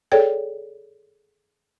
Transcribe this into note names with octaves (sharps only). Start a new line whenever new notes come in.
G#4 A4 C#5 D5 G5 G#6